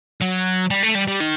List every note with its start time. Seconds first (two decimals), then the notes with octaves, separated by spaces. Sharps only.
0.21 F#3
0.70 G3
0.83 A3
0.95 G3
1.07 G3
1.20 D#3